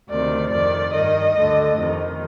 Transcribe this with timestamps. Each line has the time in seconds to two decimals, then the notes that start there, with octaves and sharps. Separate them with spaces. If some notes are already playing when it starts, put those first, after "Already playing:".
0.10 D2 C3 D#3 D5
0.52 F2 D#3 D5
0.93 G2 D#3 D#5
1.36 D2 D3
1.77 F2 C3 D#3